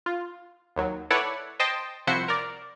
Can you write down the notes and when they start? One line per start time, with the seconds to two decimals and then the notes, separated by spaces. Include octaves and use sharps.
0.06 F4
0.76 D#2 F#3
1.10 E4 A4 B4 C#5 D5 F#5
1.60 C5 D#5 G5 A5 C6
2.07 C2 F3 E4 F#4 C5 C#7
2.28 A#4 D5